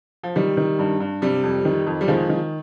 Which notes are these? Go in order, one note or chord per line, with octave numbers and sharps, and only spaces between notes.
F3
D#3 G3
D#3
G2
G2
C3 G3
F2
D#3
F2
G3
D#3 F3 G#3
D#3